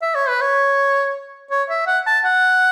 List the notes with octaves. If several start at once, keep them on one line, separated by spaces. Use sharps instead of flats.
E5
C#5
B4
C#5
C#5
E5
F#5
A5
F#5